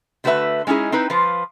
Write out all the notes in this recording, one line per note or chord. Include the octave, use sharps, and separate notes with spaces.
D3 A3 F#4 A#4 B4 E5
G#3 C#4 D#4 E4 G#4
C4 D#4 E4 B4
F3 F4 B4 C5